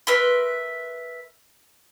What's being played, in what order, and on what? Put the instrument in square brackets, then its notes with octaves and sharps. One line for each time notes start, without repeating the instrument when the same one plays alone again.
[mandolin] A#4 B4 E5 C6